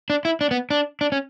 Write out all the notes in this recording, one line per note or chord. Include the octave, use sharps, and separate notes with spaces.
D4
E4
D4
B3
D4
D4
C#4